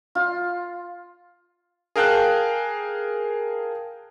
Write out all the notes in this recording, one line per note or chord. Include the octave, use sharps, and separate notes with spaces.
F4
G#4 A#4 F5 G5 A5 F#6